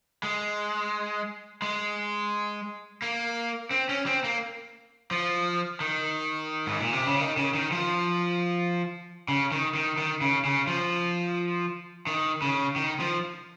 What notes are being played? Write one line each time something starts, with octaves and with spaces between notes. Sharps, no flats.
G#3
G#3
A#3
C4
C#4
C4
A#3
F3
D#3
G#2
A#2
C3
C#3
D#3
C#3
D#3
F3
C#3
D#3
D#3
D#3
C#3
C#3
F3
D#3
C#3
D#3
F3